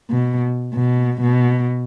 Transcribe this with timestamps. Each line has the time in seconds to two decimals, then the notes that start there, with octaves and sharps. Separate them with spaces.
0.10 B2
0.74 B2
1.21 B2